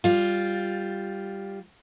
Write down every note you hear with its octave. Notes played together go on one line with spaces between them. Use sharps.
G3 F4